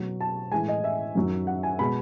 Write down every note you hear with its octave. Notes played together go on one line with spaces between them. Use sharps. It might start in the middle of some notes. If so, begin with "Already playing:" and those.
Already playing: B2 F#3
A5
A2 E3 G#3 G#5
D#5
E5
F#2 D#3 F#3
F#5
G#5
B2 G#3 B5